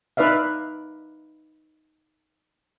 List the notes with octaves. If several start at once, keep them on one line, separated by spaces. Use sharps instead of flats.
D#4 B4 D5 E5 F5